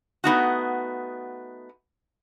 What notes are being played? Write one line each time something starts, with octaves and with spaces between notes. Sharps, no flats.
A3 B3 D#4 F#4